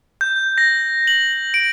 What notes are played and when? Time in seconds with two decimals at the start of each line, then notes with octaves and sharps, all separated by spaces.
0.21 G6
0.58 A#6
1.07 F#7
1.54 D7